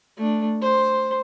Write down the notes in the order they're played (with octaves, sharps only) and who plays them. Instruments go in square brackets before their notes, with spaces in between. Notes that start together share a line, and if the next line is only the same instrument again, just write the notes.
[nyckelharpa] A3 D4
C5 C6